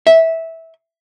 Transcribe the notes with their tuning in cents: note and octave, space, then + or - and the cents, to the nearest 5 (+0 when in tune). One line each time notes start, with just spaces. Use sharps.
E5 -15